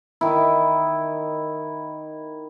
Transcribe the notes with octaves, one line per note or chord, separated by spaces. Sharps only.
D#3 E4